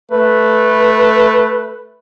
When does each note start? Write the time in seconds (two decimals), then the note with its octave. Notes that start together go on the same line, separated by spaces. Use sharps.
0.12 A3 B4